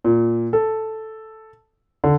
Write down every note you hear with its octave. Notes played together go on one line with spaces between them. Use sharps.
A#2
A4
D3